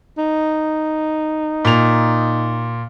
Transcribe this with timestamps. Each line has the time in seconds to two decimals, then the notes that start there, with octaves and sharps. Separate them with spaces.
0.18 D#4
1.65 A#2 F7